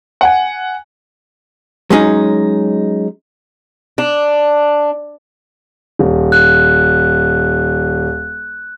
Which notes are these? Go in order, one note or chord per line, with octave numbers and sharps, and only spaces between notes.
F#5 G#5
F#3 G#3 C#4 D#4
D4
D#1
F#6